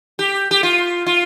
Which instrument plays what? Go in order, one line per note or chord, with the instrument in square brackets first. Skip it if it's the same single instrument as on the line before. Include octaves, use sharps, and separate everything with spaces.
[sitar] G4
G4
F4
F4